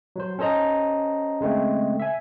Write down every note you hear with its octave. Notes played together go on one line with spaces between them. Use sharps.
F#3 C5
C#4 A4 C5 D#5 A#5
C#3 G#3 A3 C4
E5 G#5